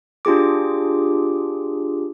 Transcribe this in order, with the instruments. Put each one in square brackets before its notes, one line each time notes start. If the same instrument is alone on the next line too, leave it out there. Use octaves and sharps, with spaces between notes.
[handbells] D4 F4 G4 G#4 D6